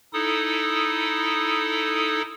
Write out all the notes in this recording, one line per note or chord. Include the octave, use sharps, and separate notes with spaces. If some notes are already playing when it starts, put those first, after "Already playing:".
D#4 E4 A4 D#6